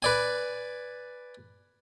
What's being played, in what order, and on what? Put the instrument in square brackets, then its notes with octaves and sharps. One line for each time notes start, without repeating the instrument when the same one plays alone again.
[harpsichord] B4 D5 G#5